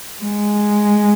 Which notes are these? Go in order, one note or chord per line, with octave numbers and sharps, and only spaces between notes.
G#3